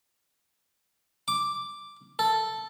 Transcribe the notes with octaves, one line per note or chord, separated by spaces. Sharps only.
D6
A4